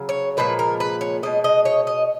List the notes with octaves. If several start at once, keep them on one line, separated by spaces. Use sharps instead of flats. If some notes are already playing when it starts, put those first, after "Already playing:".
Already playing: C#3 F#3
C#5
A#2 F3 G#3 B4
A#4
B4
C#5
B2 G#3 D#5
D#5
C#5
D#5